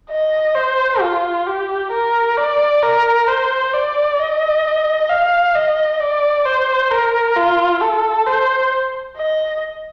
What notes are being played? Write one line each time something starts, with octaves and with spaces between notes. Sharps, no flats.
D#5
C5
F4
G4
A#4
D5
A#4
C5
D5
D#5
F5
D#5
D5
C5
A#4
F4
A4
C5
D#5